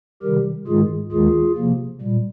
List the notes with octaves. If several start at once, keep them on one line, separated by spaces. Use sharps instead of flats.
C3 D#3 G3 G4 A#4
G#2 D#3 G#3 F4 G#4
D#2 D#3 G#3 F4 G#4
C3 F3 A#3
A#2 G3